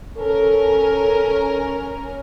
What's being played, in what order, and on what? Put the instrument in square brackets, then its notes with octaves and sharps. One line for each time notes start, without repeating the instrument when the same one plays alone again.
[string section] C#4 A#4 [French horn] A4